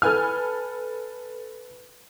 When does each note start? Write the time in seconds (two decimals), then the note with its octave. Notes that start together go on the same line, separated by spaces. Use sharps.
0.02 A4 B4 G#5 F6